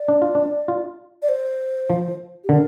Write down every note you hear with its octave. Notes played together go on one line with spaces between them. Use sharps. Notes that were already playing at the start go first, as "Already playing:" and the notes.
Already playing: D5
D4
F4
D4
F4
D5
C5
F3
G4
D3 A#4